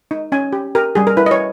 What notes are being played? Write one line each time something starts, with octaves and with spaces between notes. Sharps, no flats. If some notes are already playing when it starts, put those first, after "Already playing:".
D#4
C#4 G#5
G4
G4 A#4
G3 G#4
A#4
E4 B4
D#5
C#5